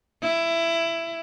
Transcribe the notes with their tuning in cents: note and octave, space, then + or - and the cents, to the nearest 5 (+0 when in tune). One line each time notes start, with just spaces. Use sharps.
E4 +15